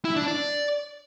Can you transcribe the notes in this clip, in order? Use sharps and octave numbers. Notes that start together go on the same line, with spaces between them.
E4
D4
D5